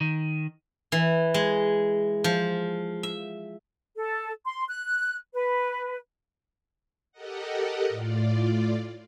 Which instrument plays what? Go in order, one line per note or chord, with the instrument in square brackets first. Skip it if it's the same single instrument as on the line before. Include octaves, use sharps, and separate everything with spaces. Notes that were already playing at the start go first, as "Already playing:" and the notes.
[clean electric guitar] D#3
[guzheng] E3
G#3
F3
E5
[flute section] A4
C6
F#6
B4
[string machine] G4 A4 A#4 D#5 F#5
A2 F4 D5